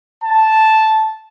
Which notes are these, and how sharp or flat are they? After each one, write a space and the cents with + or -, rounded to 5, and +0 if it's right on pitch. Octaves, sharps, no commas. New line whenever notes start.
A5 -5